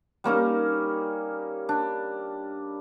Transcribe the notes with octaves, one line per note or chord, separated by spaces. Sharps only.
G3 A#3 C#4 D#4
D4